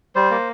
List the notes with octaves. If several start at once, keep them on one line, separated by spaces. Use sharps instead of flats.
G3 C5
A#3